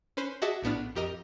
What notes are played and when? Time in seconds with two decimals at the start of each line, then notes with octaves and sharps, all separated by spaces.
0.17 C#4 B4 C5
0.42 F#4 G#4 D#5 E5 A5 D6
0.63 A#1 A2 B3 D4 F6
0.95 F2 G4 A#4 D#5 F6